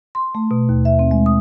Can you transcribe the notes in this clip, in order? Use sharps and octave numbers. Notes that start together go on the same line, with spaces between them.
C6
A3
B2
D#2
E5
C4
G#3
D#6